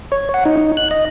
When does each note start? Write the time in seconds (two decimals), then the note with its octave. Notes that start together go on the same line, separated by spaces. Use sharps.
0.12 C#5
0.34 F#5
0.45 D#4
0.57 D#4
0.77 F#6
0.91 D#5